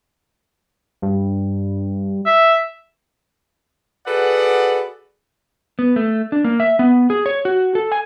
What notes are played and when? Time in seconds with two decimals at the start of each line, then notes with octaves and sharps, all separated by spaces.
1.02 G2
2.26 E5
4.07 F#4 G#4 A4 B4 D5 F#5
5.79 B3
5.96 A3
6.32 D4
6.44 A#3
6.60 E5
6.79 B3
7.10 G#4
7.26 C#5
7.45 F#4
7.75 A4
7.92 G#5